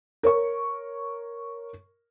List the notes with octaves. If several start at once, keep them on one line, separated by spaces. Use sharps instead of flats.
A#4 C#5 C#6